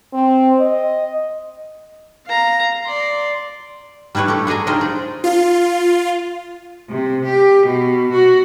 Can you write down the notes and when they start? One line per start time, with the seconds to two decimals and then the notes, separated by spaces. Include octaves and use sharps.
0.13 C4
0.59 D#5
2.26 F5 A#5
2.86 D5 C6
4.15 G3 D4 E4 B4 C#5
4.28 A3 G4 A4
4.47 D4 G#4 D#5 G#5 A#5
4.67 D4 D#4 F4 G4 G#4 C5
4.81 D5
5.24 F4
6.89 C3
7.25 G4
7.66 B2
8.12 F#4